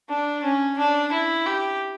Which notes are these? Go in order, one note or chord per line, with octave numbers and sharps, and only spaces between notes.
D4
C#4
D4
E4
G4